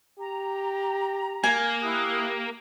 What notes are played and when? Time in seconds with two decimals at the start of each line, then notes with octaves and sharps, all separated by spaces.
0.19 G4 A#5
1.44 A#3 G#5
1.82 E4 G4 D#6 F#6